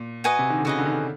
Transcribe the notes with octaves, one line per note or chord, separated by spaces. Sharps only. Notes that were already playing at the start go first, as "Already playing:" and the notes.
Already playing: A#2
F#4 B4 D#5 G#5
C3
D#3
D3
C#3 F#4 B4 D#5 G#5
D3
D#3
D3